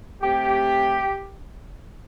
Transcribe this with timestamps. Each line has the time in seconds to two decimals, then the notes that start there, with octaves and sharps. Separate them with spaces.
0.22 C3 A3 G4